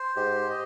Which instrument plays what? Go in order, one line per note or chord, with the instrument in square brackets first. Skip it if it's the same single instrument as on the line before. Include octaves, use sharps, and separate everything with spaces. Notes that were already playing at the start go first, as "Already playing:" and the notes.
Already playing: [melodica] C5
[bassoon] G#2 [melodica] G4
[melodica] D#5